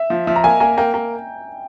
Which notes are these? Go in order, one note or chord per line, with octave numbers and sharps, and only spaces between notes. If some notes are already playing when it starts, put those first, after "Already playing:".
Already playing: E5
F3
F3 E5
A#5
A#3 G#5
A#3 G#5
A#3 G5
A#3